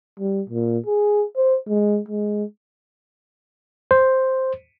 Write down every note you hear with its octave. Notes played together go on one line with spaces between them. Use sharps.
G3
A#2
G#4
C5
G#3
G#3
C5